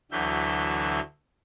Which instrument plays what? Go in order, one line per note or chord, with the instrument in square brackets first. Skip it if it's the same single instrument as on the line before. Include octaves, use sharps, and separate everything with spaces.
[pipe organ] D2 D3 E3 F#3 E5 G6